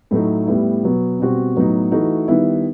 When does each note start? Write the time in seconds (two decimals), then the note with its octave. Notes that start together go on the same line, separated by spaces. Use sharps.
0.11 A2 F#3 A3 D#4
0.47 A2 G3 B3 E4
0.83 B2 F#3 B3
1.20 B2 G3 C4 F#4
1.56 A2 F#3 B3 D#4
1.92 E3 A3 D#4 F#4
2.28 D#3 G3 B3 E4